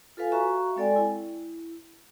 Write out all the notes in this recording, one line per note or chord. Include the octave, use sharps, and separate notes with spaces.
F4 A4 B4 F5 G#5
F#4 E5 F5 A#5 C#6
G#3 C4 A4 D5 G5 G#5
E4